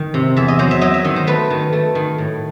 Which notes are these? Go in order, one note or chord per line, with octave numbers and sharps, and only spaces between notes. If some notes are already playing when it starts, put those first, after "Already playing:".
Already playing: D#3
C3
E2 E5
D#5
F#3 C5
E5
F#3 D#5
E5
D#3 D#5
C5
A3 B4
D#3
A3
D#3
A2